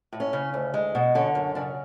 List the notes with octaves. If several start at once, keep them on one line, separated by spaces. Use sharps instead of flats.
A2
C#4
C#3
D2
G#3
B2
D3 C#4
F#2
C#3 D4